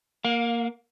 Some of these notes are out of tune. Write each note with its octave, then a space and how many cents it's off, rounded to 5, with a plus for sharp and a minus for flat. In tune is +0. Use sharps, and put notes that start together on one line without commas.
A#3 +0 F5 +30